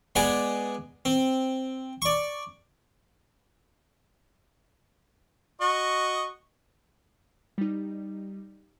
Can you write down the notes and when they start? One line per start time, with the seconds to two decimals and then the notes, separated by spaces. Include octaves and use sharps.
0.16 G#3 B3 G#4 D5 G#5
1.05 C4
2.02 D5 C#6
5.61 F#4 D#5 C#6
7.58 G3 D#4